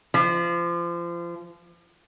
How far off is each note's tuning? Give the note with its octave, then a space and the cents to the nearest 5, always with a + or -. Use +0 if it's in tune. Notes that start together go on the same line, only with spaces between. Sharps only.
F3 -30